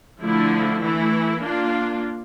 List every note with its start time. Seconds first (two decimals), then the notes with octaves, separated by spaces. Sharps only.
0.23 D3 F3 A3 E4
0.82 E3 A3 E4
1.41 A#3 D4 F4